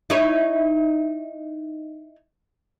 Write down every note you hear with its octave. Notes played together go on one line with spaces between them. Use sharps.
D#4 E4 C#5